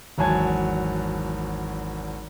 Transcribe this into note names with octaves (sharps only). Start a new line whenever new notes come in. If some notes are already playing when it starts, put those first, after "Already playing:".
G#1 E2 F#3 G#5 A5 G#6